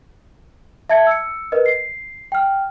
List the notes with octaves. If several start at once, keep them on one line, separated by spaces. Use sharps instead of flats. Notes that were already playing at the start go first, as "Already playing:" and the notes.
E5 A5 G#6 C#7
E6 C#7
A#4 B4 D#5
C7
G5 F6